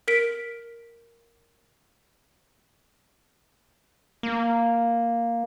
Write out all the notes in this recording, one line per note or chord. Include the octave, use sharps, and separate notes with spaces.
A#4 B6 D7
A#3